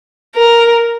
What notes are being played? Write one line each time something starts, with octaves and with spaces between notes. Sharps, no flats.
A#4